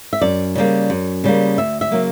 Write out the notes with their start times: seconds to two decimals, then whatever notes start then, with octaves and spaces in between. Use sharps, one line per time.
0.13 E5
0.21 F#2 D5
0.56 C#3 G3 A#3
0.90 F#2
1.24 C#3 G3 A#3
1.58 D2 E5
1.81 E5
1.91 C#3 F#3 A#3